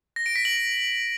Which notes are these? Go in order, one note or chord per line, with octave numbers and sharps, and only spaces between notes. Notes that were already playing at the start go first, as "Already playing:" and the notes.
A#6
D7
B6
F#7